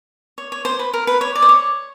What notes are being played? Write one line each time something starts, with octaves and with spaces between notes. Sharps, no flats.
C#5
C#5
C5
B4
A#4
B4
C#5
D5
C5
C#5